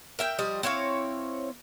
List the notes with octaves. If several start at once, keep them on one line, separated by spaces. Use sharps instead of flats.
A#4 E5 G5
F3 G3 D#5
C4 E4 C#5 F5